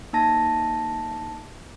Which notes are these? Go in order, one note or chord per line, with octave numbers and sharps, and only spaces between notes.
A#3 D#4 A5 A#6